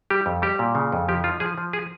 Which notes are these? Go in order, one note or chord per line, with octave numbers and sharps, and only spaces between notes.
G3 G4
F2
G3 G4
A#2
C#3
F2
F3 G4
F3 F4
F3 G#4
F3
G#4